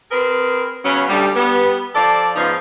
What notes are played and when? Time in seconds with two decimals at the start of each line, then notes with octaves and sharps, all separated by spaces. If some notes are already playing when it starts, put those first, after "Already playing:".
0.11 C4 G#4 A#4 B4
0.85 C#3 F#3 B3 C#4
1.09 D2 G3
1.35 G3 B3
1.95 F3 A4 D5
2.36 G#2 C#3 F3 B3 D#4